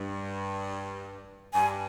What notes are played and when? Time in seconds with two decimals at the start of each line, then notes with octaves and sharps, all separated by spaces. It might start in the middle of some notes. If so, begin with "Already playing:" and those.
Already playing: G2
1.53 G2 G#5